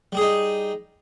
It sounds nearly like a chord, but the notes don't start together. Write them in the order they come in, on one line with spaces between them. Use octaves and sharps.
G3 G#4 D#4